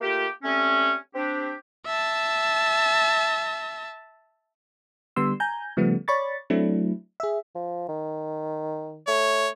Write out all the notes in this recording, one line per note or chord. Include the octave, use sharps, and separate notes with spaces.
A3 A#3 F4 G4
G3 A3 C4 C#4
C4 D4 G4
E5 A5
D3 G3 B3 C6 E6
G#5 A#5 G6
C#3 F3 G3 A3 B3
C#5 D5 B5 C#6 A6
F#3 A3 C4 D4 E4
G#4 E5
F3
D#3
A3 C#5